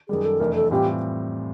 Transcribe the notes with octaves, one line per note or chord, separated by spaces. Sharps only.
F#2 D#3 G3 G#4
A4
F2 C3 E3 A3 D4 A#4
A4
A2 E3 G3 C4 F4 G4